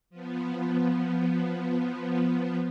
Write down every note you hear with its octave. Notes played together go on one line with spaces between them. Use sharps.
F3 B3